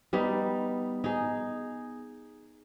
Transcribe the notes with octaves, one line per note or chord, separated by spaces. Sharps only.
G3 B3 D#4
D#4 G#4